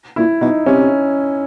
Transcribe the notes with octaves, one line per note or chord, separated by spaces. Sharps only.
A#2 E4
B2 D#4
C3 C#4